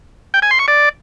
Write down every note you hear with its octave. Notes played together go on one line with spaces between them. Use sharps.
G5
G#5
C6
C#6
D5